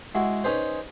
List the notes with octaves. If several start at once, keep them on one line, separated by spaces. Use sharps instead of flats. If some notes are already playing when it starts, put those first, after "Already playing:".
G#3 E4 F#4
C#4 D#4 G#4 B4 C5